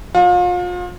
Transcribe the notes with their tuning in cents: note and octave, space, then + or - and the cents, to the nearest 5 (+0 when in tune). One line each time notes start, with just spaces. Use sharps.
F3 +35 F4 +35